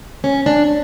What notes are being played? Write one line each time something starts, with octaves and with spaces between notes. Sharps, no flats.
C#4
D4